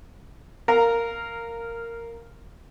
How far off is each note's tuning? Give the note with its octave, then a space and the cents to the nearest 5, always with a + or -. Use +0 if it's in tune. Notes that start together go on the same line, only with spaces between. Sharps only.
A#4 -10 F5 +0 A#5 +0